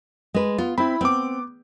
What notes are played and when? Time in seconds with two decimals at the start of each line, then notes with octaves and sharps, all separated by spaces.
0.34 G#3 B4
0.58 B3 F4
0.78 C4 E4 B5
1.01 B3 C4 D6